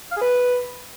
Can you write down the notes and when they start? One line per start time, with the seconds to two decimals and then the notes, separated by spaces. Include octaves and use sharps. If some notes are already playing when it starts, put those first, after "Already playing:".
0.11 F5
0.16 G#4
0.21 B4